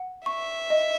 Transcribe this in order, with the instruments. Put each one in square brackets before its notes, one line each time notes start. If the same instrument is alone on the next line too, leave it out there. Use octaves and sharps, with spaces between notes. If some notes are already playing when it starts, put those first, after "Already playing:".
Already playing: [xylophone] F#5
[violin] E5 [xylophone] C#6
[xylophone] D#5